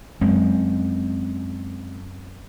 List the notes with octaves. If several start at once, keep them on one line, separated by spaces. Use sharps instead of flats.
F#2 G#3 C4